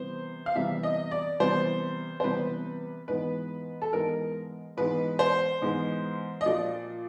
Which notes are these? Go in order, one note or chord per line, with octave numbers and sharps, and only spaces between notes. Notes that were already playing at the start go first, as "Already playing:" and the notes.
Already playing: C3 E3 G3 B3 C5
F5
C3 E3 G3 B3 E5
D#5
D5
C3 E3 G3 B3 C5
C5
C3 E3 G3 B3 B4
G#2 E3 G#3 B3 B4
A4
G#2 E3 G#3 B3 A#4
G#2 E3 G#3 B3 B4
C5
G#2 E3 G#3 B3
D#5
A#2 F3 A#3 D5